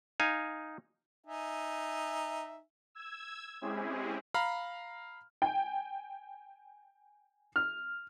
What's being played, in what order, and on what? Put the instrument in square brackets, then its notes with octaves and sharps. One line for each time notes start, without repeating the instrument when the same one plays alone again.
[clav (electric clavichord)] D#4 F5 G#5
[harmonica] D#4 E5 G#5
[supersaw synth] E6 G#6
G#3 C4 C#4 E4 G4 G#4
[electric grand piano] F5 A#5 B5 F6
[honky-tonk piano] G5 G#5
F6